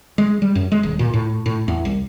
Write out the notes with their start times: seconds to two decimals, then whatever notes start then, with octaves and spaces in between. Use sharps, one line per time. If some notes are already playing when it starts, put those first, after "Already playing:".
0.18 G#3
0.42 G3
0.55 F#2
0.72 G#3
0.83 D#1
0.99 A#2
1.14 A2
1.46 A2
1.68 E2
1.85 C2